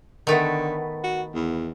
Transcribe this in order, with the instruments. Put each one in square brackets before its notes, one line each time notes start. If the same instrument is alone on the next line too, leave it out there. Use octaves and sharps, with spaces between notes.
[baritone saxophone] D3 [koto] D#3 A3 B3
[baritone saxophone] F#4
E2